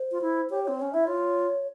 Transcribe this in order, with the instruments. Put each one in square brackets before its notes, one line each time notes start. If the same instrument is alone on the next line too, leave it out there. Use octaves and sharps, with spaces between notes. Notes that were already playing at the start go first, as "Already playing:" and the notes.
Already playing: [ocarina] C5
[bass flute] F4
E4
[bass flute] G4 [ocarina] C#5
[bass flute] C4 [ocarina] C#5
[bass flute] C#4 [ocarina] C#5
[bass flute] E4 [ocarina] E5
[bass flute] F4 [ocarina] C#5